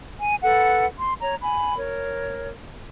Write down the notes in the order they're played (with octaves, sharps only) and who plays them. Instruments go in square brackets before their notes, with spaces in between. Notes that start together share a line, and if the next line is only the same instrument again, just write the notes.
[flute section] G#5
A4 B4 F#5
C6
C#5 A#5
G#5 B5
A#4 C#5